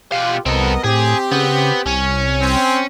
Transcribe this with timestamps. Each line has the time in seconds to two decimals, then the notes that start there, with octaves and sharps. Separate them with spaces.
0.12 B2 F4 G4 F5 F#5
0.46 C2 B3 C4 A4 A#4 D#5
0.84 A2 C4 G4 G#4
1.31 C#3 B3
1.86 C2 C#4
2.41 C4